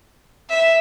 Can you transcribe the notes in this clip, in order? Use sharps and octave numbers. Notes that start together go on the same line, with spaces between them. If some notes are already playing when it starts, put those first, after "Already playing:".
E5